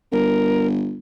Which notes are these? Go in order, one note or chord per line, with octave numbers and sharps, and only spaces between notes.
G1 A#4